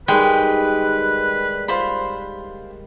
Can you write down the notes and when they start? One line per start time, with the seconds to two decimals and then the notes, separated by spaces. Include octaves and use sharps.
0.08 D#3 G3 G#3 B4 G5
1.68 F4 C5 B5